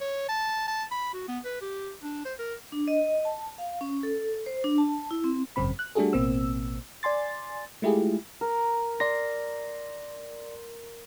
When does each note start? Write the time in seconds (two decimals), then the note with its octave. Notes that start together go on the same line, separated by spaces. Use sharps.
0.01 C#5
0.29 A5
0.68 A5
0.91 B5
1.14 F#4
1.28 B3
1.45 B4
1.61 G4
2.03 D4
2.25 C5
2.39 A#4
2.72 D4
2.88 D#5
3.25 A5
3.58 F5
3.81 C#4
4.03 A4
4.46 C5
4.64 D4
4.78 A5
5.11 E4
5.24 C4
5.56 G#1 F#2 C#3 C4 B5
5.79 F#6
5.95 G3 A3 D4 F#4 G#4 A4
6.13 A1 B2 A#3 C4 E6
7.03 D5 G#5 C6 A6
7.82 G#3 A3 E4 F4 G4 G#4
8.41 A#4
9.00 D5 C6 A#6